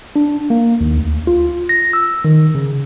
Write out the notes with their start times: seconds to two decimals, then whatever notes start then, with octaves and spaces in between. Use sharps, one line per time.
0.16 D4
0.50 A#3
0.81 D#2
0.98 D2
1.27 F4
1.69 A#6
1.93 E6
2.25 D#3
2.55 C#3